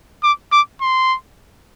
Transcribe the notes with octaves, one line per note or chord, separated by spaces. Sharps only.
D6
D6
C6